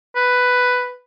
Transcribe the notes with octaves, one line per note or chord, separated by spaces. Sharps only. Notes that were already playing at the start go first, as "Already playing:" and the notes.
B4